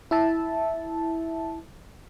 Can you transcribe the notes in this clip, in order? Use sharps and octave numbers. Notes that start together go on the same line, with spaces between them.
E4 E5 A5